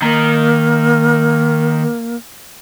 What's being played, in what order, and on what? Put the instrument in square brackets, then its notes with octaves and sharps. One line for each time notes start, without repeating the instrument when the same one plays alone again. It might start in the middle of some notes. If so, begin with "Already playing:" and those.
[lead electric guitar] D#3 A#5 [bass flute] A#3